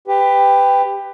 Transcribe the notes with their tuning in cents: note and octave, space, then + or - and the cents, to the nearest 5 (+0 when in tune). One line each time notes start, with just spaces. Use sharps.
G4 +15 B4 +20